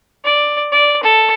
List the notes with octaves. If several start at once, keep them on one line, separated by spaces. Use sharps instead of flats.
D5
D5
A4